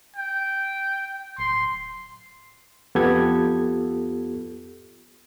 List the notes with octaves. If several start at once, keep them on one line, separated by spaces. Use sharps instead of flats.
G5
D1 C6
F2 B3 F4 G4 A4 G#6